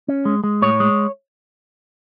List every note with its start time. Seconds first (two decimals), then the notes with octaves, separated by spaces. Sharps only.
0.08 C#4
0.25 G#3
0.44 G#3
0.62 A2 C#5
0.80 G#3